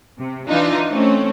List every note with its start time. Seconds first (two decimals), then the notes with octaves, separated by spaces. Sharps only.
0.18 C3
0.48 E3 D4 D#4 F4
0.92 A3 C4 C#4